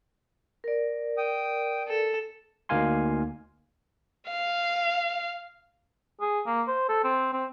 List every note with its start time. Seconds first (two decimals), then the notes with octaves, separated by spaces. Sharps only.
0.64 A#4 D5
1.17 G5 D#6
1.88 A4
2.69 D2 A#3 D#4 F5 G#5 C6
4.31 F5
6.21 G#4
6.47 A#3
6.68 C5
6.89 A4
7.04 C4
7.34 C4